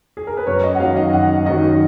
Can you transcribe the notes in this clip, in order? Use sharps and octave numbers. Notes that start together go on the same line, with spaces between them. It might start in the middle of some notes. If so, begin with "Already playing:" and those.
G#4
A#4
B4
F#2 C#5
D#5
F#5
D#3 F#3 F5
D#5
F#2 F#5
D#3 F#3 D#5